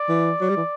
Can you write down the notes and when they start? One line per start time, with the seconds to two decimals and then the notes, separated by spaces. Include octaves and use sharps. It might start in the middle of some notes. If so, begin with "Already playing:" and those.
Already playing: D5
0.09 E3
0.41 F#3
0.49 G3
0.57 E3